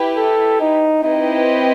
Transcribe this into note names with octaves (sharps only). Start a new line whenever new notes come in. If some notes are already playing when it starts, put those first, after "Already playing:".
Already playing: E4 G4 B4
A4
D#4
C4 D#4 E4 G4 B4 D#5